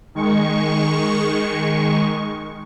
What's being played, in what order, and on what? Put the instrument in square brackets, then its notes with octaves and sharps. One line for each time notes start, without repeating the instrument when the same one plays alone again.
[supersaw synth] D#3 G#3 C#6